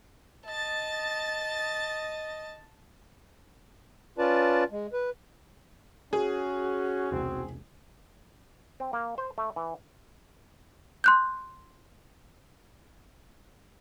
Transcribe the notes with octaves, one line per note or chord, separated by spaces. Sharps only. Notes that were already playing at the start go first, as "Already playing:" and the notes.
D#5 A5 A6
C#4 F4 B4 D5 A5
G#3
B4
C#4 F#4 G#4
E1 C2 C4
C4
A#3
C5
A3
E3
C6 F#6 G6